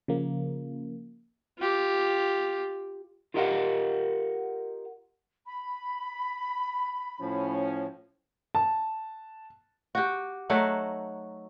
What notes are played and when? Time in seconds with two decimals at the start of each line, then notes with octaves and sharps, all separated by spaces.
0.08 C#3 F3 A#3
1.58 F4 G4
3.34 F4 G4 A#4 D#5 F5 F#5
5.46 B5
7.20 A2 F3 C#4
8.55 A5
9.95 F#4 G4
10.50 F#3 A3 D#4 F#5